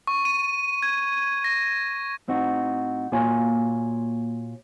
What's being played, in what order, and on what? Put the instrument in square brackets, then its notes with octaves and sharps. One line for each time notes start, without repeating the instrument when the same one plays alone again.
[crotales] C#6
D#7
G#6
A#6
[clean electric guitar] A2 C4 D#4 F#4
A#2 A#3 F4 F#4 C#5 G#5